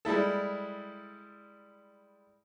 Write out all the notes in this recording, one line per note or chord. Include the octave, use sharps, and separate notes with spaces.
G3 G#3 E4 A4